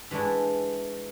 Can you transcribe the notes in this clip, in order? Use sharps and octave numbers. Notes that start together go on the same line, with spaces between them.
E3 G#3 A3 D4 E4